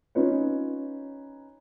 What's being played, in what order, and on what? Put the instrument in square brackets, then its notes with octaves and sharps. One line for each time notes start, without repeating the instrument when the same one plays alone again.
[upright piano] C#4 D#4 F4 B4 C#5